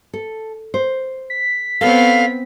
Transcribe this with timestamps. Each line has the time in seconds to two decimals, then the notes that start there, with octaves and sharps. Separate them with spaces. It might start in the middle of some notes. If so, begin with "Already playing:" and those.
0.13 A4
0.74 C5
1.30 B6
1.81 B3 C4 A4 C#5 F5